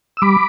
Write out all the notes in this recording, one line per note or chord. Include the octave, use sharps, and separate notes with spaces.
E6
G3 B5 D6